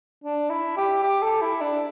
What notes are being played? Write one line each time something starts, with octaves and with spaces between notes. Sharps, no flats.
D4
E4
G4
G4
A4
E4
D4